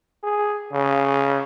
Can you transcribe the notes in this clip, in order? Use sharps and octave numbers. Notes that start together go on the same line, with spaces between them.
G#4
C#3